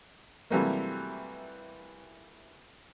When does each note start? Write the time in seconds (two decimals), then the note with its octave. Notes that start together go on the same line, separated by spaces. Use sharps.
0.50 C3 E3 F#3 G3 A3 A#3